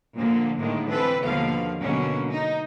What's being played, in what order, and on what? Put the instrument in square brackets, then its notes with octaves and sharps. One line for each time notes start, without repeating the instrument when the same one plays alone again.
[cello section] A#2 D3 F3 A#3
A2 D3 D#3 G#3 A#3
E3 C4 A4 B4
D#2 B2 D3 F3 F5
B2 D3 F#3 G#3 A#3 C#4
D#4